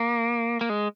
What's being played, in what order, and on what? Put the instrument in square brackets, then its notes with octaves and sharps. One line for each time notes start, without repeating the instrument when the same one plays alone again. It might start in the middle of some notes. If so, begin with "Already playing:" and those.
Already playing: [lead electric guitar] A#3
A#3
G#3